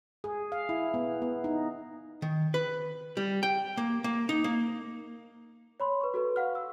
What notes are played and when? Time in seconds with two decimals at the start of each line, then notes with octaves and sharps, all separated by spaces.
0.24 G#4
0.52 F5
0.69 E4
0.94 B3
1.22 B3
1.44 D#4
2.22 D#3
2.54 B4
3.17 G3
3.43 G5
3.77 A#3
4.04 A#3
4.29 D#4
4.44 A#3
5.80 C#5 B5 C6
6.01 B4 C#6
6.14 F#4 A4 B4
6.36 F5 F#5 F6
6.55 E6